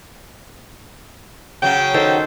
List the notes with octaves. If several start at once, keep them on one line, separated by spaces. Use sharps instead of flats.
C#3 F#3 G5
D#3 A4 C5